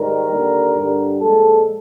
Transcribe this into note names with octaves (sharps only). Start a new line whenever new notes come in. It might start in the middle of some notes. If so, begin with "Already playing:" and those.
Already playing: G#2 D#3 G3 A#4
D#2 D3 G3
G2 D3 G3
A#2 F3 G#3 A4